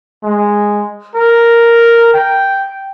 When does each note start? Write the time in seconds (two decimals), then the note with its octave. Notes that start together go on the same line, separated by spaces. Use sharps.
0.23 G#3
1.15 A#4
2.14 G5